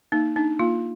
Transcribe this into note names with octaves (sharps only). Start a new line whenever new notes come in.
A#3 D#4
D4 D#4
A#3 F4